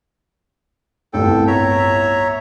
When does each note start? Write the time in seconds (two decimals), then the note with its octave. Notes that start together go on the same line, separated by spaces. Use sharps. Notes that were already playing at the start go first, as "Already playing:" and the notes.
1.13 G1 C2 A2 A4 G5
1.47 C#5 E5 A#5